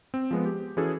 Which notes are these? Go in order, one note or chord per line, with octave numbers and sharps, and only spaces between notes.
C4
F3 G#3 B3
G4
E3 C#4 F#4 G#4 A4